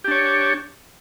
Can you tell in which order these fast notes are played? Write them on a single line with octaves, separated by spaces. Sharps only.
G4 D4 C#5